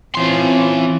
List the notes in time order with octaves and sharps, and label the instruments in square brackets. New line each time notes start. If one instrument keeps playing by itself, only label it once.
[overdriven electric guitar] E3 C6 [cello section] C4 C#4 F4